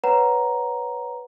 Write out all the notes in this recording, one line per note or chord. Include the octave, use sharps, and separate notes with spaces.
B4 C#5 F#5 A#5